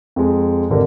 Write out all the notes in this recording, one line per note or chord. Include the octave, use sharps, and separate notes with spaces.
F2 G#3
G#1 D3 G4 A#4